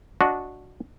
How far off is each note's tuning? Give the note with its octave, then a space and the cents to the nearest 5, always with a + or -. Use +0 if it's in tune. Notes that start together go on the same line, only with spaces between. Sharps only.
D4 -10 F#4 -10 D#5 +0